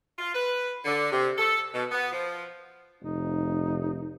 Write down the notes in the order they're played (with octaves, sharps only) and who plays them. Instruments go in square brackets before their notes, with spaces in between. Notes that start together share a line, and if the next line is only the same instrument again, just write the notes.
[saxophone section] F4
B4
D3
C3
A4
B2
B3
F3
[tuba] F1 [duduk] D#4